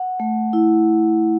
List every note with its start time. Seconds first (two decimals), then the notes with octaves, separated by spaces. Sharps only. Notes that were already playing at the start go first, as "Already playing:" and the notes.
Already playing: F#5
0.20 A3
0.53 E4